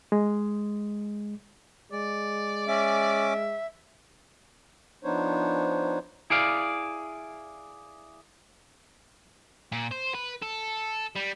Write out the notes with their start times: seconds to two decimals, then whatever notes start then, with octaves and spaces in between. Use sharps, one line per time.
0.12 G#3
1.93 G#3 D5
2.67 C#4 E5 D6
5.04 F3 B3 D4 D#4 C5 C#5
6.30 E4 G#4 D5 F5
9.72 A#2
9.91 C5
10.15 B4
10.42 A4
11.16 G3